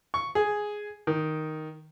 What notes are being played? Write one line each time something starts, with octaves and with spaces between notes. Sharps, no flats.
C#6
G#4
D#3